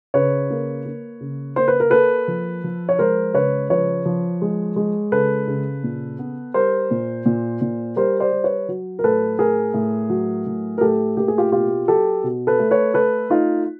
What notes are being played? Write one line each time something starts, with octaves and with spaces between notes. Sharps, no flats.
C#3 B4 C#5
A#3
A#3
C#3
A#3 C5
B4
A#4
A#3 A4 B4
F3
F3
C#5
G#3 A#4 C5
C#3 B4 C#5
F3 B4 C#5
F3
G#3
G#3
C#3 A4 B4
C#3
A#2
B3
G3 A#4 C5
A#2
A#2
A#2
G3 A#4 C5
C5 D5
G3
B4 C#5
F#3
A#4
A2 A4 B4
A2 G#4 A#4
A2
F#3
A2
A#4
A2 G4 A4
A#3 G4
G#4
F4 G4
B2 F4 G4
F#3 G4 A4
B2
A4 B4
A3
B4 C#5
A3 A4 B4
A3 D#4 F4